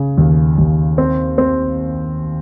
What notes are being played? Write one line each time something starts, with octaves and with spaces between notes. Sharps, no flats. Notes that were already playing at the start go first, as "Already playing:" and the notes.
Already playing: C#3
D#2
D#2
C4
C4